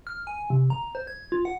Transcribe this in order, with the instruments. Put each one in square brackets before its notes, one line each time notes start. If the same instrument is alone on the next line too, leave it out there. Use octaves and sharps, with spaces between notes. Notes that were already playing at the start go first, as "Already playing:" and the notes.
[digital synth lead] F6
G#5
C3
A#5
C5
G#6
F4
F#5